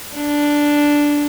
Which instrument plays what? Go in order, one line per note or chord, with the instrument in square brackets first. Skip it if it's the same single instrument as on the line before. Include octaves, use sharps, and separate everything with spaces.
[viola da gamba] D4